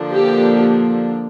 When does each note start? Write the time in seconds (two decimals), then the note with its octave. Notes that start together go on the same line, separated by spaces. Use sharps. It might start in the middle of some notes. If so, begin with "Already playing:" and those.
Already playing: D3 F3 A#3 D4
0.12 G4